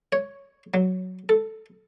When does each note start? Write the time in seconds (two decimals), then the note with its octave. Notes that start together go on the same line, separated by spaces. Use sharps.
0.12 C#5
0.74 F#3
1.29 A4